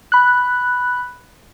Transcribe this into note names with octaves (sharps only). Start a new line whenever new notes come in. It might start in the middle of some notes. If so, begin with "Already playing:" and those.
B5 F#6